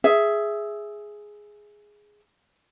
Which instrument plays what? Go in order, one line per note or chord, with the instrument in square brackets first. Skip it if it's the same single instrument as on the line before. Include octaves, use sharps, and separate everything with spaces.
[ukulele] G#4 E5